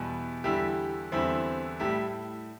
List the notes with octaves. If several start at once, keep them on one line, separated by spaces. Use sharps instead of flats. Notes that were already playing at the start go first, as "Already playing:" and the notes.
Already playing: E2 B2 G3
E2 D3 G3 E4 G4
E2 D3 G3 C4 E4
A2 G3 E4 G4